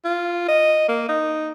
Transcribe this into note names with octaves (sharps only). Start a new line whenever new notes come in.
F4
D#5
A#3
D#4